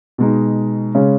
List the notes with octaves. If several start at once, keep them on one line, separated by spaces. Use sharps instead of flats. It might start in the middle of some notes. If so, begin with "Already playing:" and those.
B2 G#3 D#4
C#3 G#3 C#4